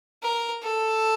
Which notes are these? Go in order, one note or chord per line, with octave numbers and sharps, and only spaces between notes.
A#4
A4